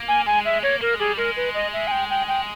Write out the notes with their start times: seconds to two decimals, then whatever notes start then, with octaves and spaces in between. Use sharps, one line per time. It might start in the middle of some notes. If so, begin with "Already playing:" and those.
Already playing: A#3
0.08 G#5
0.26 G#3 G#5
0.45 E5
0.63 A#3 C#5
0.81 A#3 A#4
0.94 G#3
0.99 G3 G#4
1.18 G#3 A#4
1.37 B4
1.54 D#5
1.73 E5
1.87 G#5
1.91 G5
2.10 G5
2.28 G5